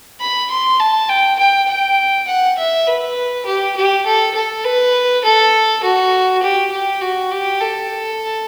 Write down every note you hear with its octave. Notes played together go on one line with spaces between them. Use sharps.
B5
C6
A5
G5
G5
G5
F#5
E5
B4
G4
G4
A4
A4
B4
A4
F#4
G4
G4
F#4
G4
A4